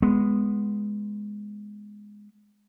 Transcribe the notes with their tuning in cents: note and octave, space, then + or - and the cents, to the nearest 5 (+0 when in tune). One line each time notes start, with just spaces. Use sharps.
G#3 +0 B3 +0